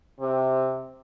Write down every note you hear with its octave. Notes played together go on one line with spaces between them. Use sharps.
C3